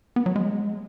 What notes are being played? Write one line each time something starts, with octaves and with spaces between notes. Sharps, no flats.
B3
F#3
G#3